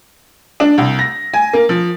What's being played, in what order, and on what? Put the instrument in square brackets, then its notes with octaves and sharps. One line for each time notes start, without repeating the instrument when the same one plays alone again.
[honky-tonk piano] D4
C2
A#6
G#5
A#3
F3